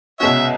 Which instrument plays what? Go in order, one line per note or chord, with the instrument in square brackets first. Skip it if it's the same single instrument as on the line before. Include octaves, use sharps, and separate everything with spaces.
[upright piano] C2 B2 G#3 C#4 F#4 [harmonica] C#5 E5